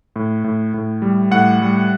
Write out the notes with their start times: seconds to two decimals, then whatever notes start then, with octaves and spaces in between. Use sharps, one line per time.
0.16 A2
0.44 A2
0.74 A2
1.02 G3
1.31 A2 F#5
1.61 G3